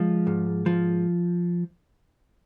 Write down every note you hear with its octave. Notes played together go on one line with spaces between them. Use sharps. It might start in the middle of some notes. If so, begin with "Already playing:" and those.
Already playing: F3 G#3
G#2
F3